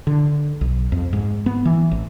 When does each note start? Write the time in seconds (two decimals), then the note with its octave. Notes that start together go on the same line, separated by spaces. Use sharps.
0.07 D3
0.61 B1
0.92 F2
1.13 G#2
1.46 B3
1.65 E3
1.91 A1